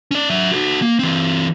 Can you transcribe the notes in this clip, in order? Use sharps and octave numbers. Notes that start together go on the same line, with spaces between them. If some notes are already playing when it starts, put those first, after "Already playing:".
C#4 D5
F#3 E5
F#4 A4
A#3
E3 C4